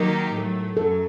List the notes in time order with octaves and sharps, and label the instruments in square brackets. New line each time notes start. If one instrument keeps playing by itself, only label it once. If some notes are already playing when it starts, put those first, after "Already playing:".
Already playing: [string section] D#3 F#3 A#3 D#4 G4 [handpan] A#4
[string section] A2 F#3 A3
[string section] F#2 F#3 [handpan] A4